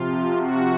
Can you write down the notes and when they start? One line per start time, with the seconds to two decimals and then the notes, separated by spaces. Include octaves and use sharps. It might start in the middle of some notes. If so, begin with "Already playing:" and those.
Already playing: C3 F3 F4
0.36 F#4